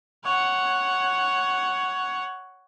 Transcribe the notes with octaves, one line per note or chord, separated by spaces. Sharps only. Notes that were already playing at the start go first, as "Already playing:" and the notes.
C#5 F#5